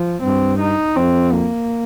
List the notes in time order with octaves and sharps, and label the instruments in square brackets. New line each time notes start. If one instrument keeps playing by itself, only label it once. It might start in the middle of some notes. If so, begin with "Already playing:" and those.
Already playing: [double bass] F3
[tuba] G2 [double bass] C4
[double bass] D#4
[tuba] F2 [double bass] C4
[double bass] A#3